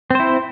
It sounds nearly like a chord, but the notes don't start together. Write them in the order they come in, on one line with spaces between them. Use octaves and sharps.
C4 C5 E4